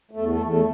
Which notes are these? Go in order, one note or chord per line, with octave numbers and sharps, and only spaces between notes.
A3
E2
A3
E2
A3